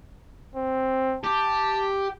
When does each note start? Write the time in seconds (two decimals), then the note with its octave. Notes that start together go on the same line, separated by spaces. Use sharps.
0.55 C4
1.24 G4 A5